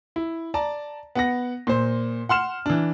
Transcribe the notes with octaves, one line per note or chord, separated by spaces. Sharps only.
E4
D5 A5 A#5
B3 F#5 A#6
A#2 C5
F#5 C6 F6 E7
E3 D4